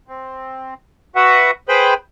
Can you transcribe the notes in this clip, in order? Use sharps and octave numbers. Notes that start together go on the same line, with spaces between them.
C4
F#4 B4 E5 F#5
G#4 B4 C5 G5 B5